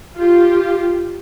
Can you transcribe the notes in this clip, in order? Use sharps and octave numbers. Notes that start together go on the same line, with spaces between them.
F4 G4